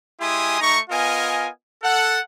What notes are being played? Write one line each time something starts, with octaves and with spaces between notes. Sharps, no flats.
G#3 E4 G4 G#5 C6 D#6
A3 D#4 A#5 C#6
B3 F4 A#4 D#5 G#5
A4 F#5